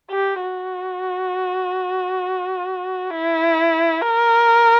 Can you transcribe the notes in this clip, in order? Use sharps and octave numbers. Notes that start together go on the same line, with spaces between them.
G4
F#4
E4
A#4